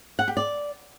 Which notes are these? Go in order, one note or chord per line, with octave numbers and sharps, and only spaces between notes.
F#5
G4
D5